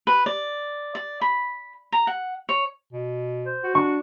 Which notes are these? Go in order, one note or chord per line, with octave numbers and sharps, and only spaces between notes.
B4
D5
D5
B5
A#5
F#5
C#5
B2
C5
F#4
D4 C#6